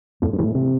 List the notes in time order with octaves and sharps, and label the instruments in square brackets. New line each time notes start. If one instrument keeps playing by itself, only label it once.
[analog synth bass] F2 [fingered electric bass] A2
[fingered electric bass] G2
[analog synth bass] E2 [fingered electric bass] B2
[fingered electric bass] A2
C3